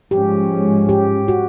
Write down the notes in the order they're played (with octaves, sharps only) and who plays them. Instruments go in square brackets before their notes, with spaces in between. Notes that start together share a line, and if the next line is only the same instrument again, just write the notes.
[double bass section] G#2 F3 G#3 C#4 [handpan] G4
[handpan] G4
F#4